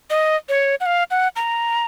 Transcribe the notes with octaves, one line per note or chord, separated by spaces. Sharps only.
D#5
C#5
F#5
F5
F#5
A#5